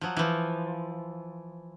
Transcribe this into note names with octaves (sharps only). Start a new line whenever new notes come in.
F3 F#3
E3 F3